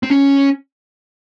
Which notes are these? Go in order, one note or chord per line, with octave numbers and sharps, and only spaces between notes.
C4
C#4